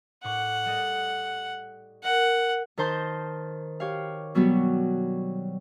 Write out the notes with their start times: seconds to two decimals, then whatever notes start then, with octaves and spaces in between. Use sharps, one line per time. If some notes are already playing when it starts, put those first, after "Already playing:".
0.24 A2 F#5 C#6 D6
0.66 G3 A4 D#5
2.04 A#4 F#5
2.77 D#3 A#4 C5 A5 G6
3.80 G4 C#5 F5
4.35 B2 F#3 G3 B3 F#4